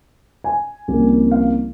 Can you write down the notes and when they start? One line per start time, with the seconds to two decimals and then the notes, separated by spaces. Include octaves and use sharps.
0.44 G#5
0.88 C2 C3 F3 A#3 C#4
1.31 F5